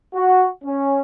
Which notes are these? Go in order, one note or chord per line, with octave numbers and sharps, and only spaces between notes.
F#4
C#4